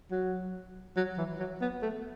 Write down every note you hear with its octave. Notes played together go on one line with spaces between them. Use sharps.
F#3
F#3
E3
F#3
B3
A3